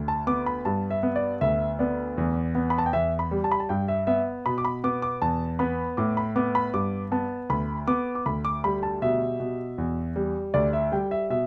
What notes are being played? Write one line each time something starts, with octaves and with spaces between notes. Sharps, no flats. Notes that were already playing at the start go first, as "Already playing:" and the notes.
Already playing: D2
A5
B3 D6
B5
G2 A5
E5
B3
D5
D2 E5
B3 D5
E2
B3
B5
A5
G5
E2 E5
B5
G3
A5
B5
A5
G2 G5
E5
B3 E5
B2 B5
D6
B5
B3 D6
D6
E2 A5
B3 B5
A2 D6
B5
B3 D6
B5
G2 D6
B3 A5
D2 B5
B3 D6
D6
D2 B5
D6
G3 B5
A5
B2 E5
B2
E2
G3
D2 D5
E5
G3 G5
E5
B2 E5